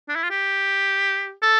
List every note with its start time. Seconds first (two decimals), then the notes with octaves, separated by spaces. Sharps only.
0.09 D4
0.16 E4
0.23 F4
0.30 G4
1.43 A4